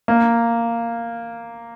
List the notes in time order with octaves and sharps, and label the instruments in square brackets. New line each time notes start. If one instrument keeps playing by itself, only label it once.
[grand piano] A#3